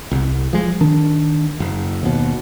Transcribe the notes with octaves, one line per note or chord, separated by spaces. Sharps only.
C2
F3 G#3
D#3 D4
F#1
D#2 B2